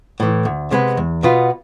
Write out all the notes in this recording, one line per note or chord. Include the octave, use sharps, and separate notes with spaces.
A2 E3
D2
C3 G#3 B3
E2
B2 B3 F4